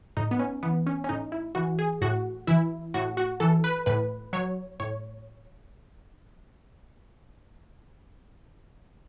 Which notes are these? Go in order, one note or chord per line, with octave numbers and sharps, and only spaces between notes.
A2 D#4
B3
C#4
E3 B3
C#4
C#4
A2 D#4
E4
E3 F#4
G#4
A2 F#4
E3 E4
A2 F#4
F#4
E3 A4
B4
A2 B4
F#3 C#5
A2 C#5